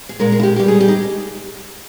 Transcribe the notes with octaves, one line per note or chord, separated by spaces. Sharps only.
G#4
A#2 G#3 A#4
G#4
E4
G4
B2 G3 G4
G#4
G4
D#4